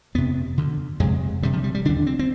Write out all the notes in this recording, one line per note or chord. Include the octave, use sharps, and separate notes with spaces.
F2 C3 B3
D2 D3
F2 C3 G#3
D2 C3 G3
F3
G3
G3
D#2 D3 D4
C4
C4